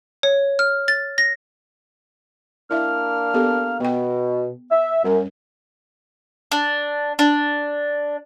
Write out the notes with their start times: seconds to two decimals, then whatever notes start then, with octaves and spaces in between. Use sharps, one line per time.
0.23 C#5
0.59 F6
0.88 A6
1.18 A#6
2.71 A#3 D4 E4 E5 F6
3.34 B3 G4 A4
3.80 B2 B3 G5
4.71 E5
5.04 F#2 G3 C#4 A#4
6.52 D4
7.19 D4